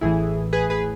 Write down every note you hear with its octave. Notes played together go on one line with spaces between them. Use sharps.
A1 A2 E3 E4 G#4
G#4 B4
G#4 B4